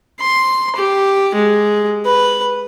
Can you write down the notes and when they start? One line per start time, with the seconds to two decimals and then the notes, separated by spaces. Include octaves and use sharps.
0.20 C6
0.76 G4
1.35 G#3
2.05 B4